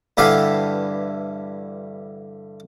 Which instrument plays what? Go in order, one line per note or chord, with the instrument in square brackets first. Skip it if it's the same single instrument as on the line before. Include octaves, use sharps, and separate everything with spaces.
[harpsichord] G2 D3 E3 G4 A4 F5